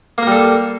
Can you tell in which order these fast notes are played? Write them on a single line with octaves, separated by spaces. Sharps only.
A#3 A#4 G3 A4